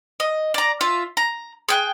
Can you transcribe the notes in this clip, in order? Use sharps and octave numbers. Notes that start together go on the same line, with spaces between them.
D#5
D5 A#5
F4 E5
A#5
G#4 G5 F#6